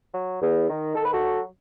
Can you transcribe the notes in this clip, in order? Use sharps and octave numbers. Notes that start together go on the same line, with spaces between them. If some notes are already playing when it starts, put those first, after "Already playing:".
F#3
E2
D#3
D#3 A4
B4
F#4 A4
F#3